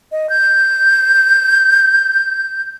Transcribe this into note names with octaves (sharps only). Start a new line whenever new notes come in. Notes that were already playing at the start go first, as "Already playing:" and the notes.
D#5
G6